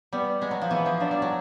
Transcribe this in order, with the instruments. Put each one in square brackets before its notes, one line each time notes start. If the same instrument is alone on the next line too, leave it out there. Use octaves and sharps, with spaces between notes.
[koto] G3 [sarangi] B3
[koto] G#3 [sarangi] B3
[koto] F#3
F3
[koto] E3 [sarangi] B3
[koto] F3
[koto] F#3 [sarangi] D4
[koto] G3
F#3